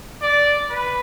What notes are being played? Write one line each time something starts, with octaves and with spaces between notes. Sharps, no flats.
D5
B4